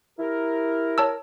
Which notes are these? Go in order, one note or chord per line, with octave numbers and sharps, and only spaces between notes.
E4 G4 A#4
C#5 A5 E6